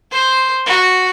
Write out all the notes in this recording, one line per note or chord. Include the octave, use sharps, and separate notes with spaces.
C5
F#4